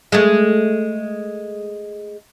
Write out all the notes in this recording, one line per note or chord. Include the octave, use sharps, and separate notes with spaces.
G#3 A3